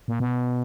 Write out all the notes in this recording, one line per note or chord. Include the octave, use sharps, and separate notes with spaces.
A#2
B2